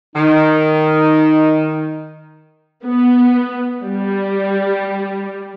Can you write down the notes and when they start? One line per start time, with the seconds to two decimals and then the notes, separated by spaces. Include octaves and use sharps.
0.16 D#3 D#4
2.85 B3
3.84 G3